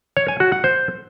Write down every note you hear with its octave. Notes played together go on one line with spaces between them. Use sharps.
C#5
G#5
F#4
F#5
C5